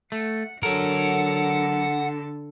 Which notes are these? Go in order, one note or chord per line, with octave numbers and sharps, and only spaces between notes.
A3 F#5
D3 F#3 A4 A#4 F#5